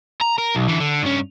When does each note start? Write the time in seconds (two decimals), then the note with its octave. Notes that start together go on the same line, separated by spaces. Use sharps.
0.21 A#5
0.38 A#4
0.55 B1
0.68 D3 E3
0.80 D3
1.03 G2 C#4